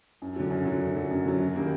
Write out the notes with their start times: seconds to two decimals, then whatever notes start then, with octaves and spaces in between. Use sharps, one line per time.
0.22 F#2
0.36 D3 F#3
0.50 F#2
0.65 D3 F#3
0.81 F#2
0.96 D3 F#3
1.11 F#2
1.26 D3 F#3
1.39 F#2
1.55 D#3 G3 A#3